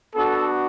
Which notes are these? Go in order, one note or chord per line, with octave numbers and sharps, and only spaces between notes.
B3 D4 F#4 A4